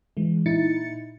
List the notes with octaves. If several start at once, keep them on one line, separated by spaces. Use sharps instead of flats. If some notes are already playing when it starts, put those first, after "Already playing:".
E3 G#3
A#2 D#4 E4 A6 C#7